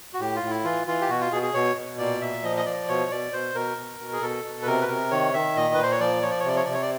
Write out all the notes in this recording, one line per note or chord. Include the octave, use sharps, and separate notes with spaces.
F#4
A2 G4
F4
A2
E4
E3 F4
E3 F4
G4
B2 F#4
F4
B2 G#4
G#4
B2 C#5
B2
A#2 D5
A#2 E5
F3 D#5
D#5
F3 D5
B2 C#5
B2 D5
B2 C5
B2 A#4
B2
B2
G#4
B2 A4
B2
B4
C3 A#4
B4
C3 A#4
D#3 C#5
D#3 E5
A#2 D#5
A#2 B4
C5
C#5
F3 D5
F3 C#5
D5
C#5
C3 D5
C#5
C3 D5
C#5
D5